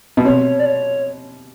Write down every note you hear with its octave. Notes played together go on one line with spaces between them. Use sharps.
B2
C3 C#5
D5
C#5